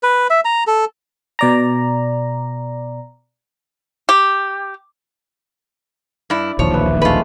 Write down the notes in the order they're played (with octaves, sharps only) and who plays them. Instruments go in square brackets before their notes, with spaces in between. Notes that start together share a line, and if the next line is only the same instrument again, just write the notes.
[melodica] B4
E5
A#5
A4
[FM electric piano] B2 D5 A#5
[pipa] G4
[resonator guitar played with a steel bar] G2 E4 [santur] D5
[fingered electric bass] D1 A#1 D#2 [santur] F3 [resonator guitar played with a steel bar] C#5
[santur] B4 E5
[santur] G#3 A3 [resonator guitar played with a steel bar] F4 B4